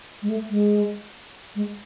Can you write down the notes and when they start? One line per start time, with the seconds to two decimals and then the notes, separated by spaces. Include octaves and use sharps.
0.22 G#3
0.29 A3
0.50 G#3
1.56 G#3